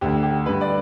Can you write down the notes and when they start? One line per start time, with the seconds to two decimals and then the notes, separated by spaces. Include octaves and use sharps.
0.01 D2 D3 G4
0.23 G4
0.46 G2 D3 B4
0.61 D5